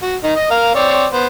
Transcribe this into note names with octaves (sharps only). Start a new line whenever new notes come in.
F#4
D#3 D#4
D#5
A#4 F5
C4 C#5 D5
B3 C5